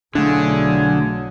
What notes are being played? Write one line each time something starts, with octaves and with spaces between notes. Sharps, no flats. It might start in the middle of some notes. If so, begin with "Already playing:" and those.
B1 D3 F#3 A3 D4 E4 F4 G#4